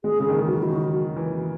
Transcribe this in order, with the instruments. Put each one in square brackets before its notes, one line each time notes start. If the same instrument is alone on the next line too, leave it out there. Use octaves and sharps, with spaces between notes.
[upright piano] G#3 [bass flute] G#4
[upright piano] C#3
[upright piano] D#3 [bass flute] G#4
[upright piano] E3
[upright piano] F#3 [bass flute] F#4
[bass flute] E4
F#4
[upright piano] F#3
E3